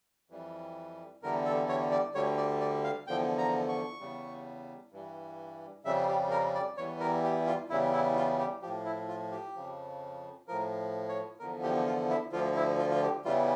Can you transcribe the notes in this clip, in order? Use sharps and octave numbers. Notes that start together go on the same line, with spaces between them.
F2 E3 G3
E2 D3 G3 A#4
A4
C#5
D5
D2 D3 G3 C#5
D5
D5
F5
E2 D3 F3 G5
A#5
C#6
E2 C#3 G3
G2 E3 G3
F2 C#3 G3 E5
G4
A#4
D5
E2 E3 G3 C#5
A#4
G4
F4
E2 C#3 G3 E4
E4
F4
G4
A2 F3 G4
E4
F4
G4
F2 C#3 F3
A2 F3 A#4
C#5
E2 D3 F3 A#4
G4
F4
E4
D2 D3 F3 F4
E4
F4
F4
G4
E2 C#3 E3 G3 F4